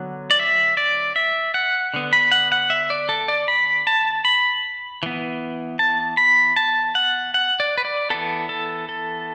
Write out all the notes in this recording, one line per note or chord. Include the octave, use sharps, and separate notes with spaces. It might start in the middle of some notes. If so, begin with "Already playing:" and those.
Already playing: D3 F#3 B3
D5
E5
D5
E5
F#5
D3 B3
B5
F#5
F#5
E5
D5
A4
D5
B5
A5
B5
E3 B3
A5
B5
A5
F#5
F#5
D5
B4
D5
E3 B3 A4
A4
A4